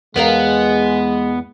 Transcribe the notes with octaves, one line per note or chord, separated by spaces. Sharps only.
E2 G#3 B3 A#4 F5